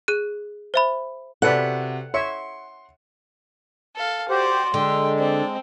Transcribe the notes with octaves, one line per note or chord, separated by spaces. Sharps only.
G#4 F#6 D#7
C5 E5 B5
C3 F#4 A4 B4 D5 F#5
C#5 E5 C6 C#7
A4 F5
F#4 G4 C5 D5 C6
D3 G#3 G5
C4 D5